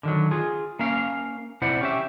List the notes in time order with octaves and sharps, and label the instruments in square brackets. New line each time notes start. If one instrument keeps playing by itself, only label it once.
[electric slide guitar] D3 D#3 F#3
F4 G#4
A#3 C#4 F5
C3 E4 C5 D5 F#5
C#4 G4 E5